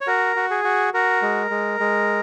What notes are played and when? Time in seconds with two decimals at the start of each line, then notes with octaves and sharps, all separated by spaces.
0.01 C#5
0.07 F#4 A#4
0.36 F#4
0.51 G#4
0.64 F#4
0.94 F#4 A#4
1.22 G#3
1.51 G#3
1.80 G#3